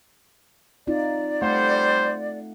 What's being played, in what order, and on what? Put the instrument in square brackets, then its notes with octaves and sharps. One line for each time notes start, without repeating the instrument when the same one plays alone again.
[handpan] C4 D#4 F4 [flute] D5
[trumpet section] G3 C5 [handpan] A3 F#5